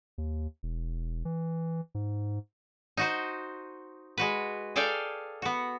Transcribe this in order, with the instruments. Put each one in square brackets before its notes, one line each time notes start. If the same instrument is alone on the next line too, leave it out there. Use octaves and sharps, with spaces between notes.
[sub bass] D#2
E1
E3
G#2
[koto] D#4 F#4 C5
G#3 F#4 B4
G#4 A4 D5 F5 G5 G#5
B3 F#4